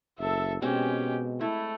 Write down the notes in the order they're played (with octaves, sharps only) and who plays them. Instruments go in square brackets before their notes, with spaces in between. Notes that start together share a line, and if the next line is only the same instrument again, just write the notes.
[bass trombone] F#1 [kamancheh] A4 E5
[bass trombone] B2 [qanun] G#3 C4 [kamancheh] C#4 G4
[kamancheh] A3 [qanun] E4